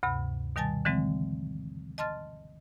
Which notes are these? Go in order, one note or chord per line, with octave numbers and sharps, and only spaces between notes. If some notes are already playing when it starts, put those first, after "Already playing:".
D2 G2 C3 B5
B2 D#3 G3 G#5 A5 A6
D3 E3 F#3 G#3 C4
D#5 A5 C6 F6 A6